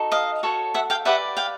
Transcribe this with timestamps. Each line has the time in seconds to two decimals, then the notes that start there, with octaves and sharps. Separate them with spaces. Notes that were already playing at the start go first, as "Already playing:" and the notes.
Already playing: D#4 F#4 A4
0.12 D#5 F5
0.43 F#4 A4 C#5
0.74 E5 F#5
0.90 F5 G5
1.05 G4 B4 D5 E5 F#5
1.37 F5 G5